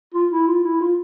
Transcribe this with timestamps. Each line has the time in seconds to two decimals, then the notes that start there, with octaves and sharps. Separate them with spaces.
0.14 F4
0.31 E4
0.48 F4
0.64 E4
0.81 F4